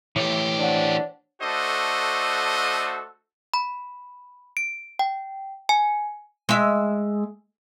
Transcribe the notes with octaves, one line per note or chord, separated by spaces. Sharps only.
A2 E3 A3 G4 C#5 D6
D4 C5 C#5 F#5
A3 D4 F#4 A4 C5 D#5
B5
D7
G5
G#5
G#3 E5